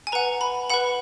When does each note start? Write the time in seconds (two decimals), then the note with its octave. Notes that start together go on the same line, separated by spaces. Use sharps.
0.07 G#5
0.12 B4 F#5 A#5
0.41 B5
0.70 B4 F#5 B5